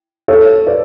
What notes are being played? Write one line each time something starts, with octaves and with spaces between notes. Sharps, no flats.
A4 C#5
B4 D5